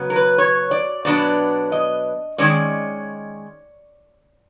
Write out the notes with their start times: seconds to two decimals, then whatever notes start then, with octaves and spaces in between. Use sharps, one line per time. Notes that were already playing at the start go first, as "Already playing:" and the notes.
Already playing: C#3 F#3 B3
0.10 A#4
0.16 B4
0.38 C#5
0.71 D5
1.05 B2 F#3 B3 D4 D5
1.72 D#5
2.38 D#3 G#3 C#4 D5